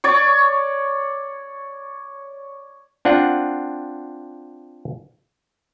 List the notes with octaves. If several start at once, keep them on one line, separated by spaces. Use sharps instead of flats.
C#5 D5 C#6
C4 D4 F4 F#5